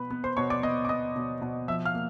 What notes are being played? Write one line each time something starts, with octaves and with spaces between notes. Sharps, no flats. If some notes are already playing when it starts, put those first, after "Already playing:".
Already playing: B2 B3 B4 B5
B3
C5 C6
B2 C#5 C#6
D5 D6
B3 D#5 D#6
D6
B3 D#5 D#6
B2
B2
F3 E5 E6
F5 F6
A#3